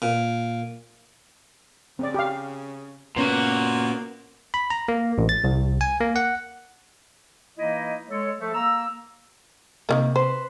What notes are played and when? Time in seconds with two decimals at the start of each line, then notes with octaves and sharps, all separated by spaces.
0.02 A#2
1.99 C#3 C4 D5
2.14 G4 F5
3.16 A#2 A#3 B3 C#4 F#4
4.54 B5
4.70 A#5
4.88 A#3
5.18 A1
5.29 A6
5.44 C2
5.81 G#5
6.00 A#3
6.16 F#5
7.57 E3 A#3 D#4 E4 D#5
8.09 G#3 A4 C#5
8.39 F3 A3 A4
8.54 A#3 A#5 E6
9.89 C3 D#3 G3 A#3
10.16 B4 C5 C6 E7